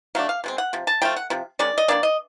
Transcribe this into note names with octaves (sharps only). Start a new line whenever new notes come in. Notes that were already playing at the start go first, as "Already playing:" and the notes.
F#3 A3 D4 F5
F5
B2 G#3 C4
F#5
C3 F3
A5
F3 A3 F4 G5
F#5
C3 F3
D#3 G#3 C#4 D5
D#5
D#3 F#3 A#3 D4 D5
D#5